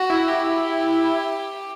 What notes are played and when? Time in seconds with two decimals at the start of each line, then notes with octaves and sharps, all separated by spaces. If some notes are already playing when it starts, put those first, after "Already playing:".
Already playing: F#4
0.10 E4
0.28 G4